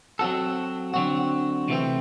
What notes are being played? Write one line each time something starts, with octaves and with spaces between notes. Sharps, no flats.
F#3 C4 F#4 A4
D3 F#3 C4 F#4
C3 E3 A3 C4